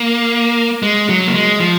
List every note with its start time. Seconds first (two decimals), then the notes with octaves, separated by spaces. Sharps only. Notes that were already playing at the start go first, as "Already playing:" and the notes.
Already playing: A#3
0.83 G#3
1.09 F#3
1.27 A#3
1.34 G#3
1.60 F3